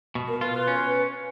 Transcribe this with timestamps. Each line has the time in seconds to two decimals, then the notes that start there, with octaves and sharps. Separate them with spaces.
0.15 B2
0.28 A#4
0.41 F4 B4
0.54 B4
0.68 C#4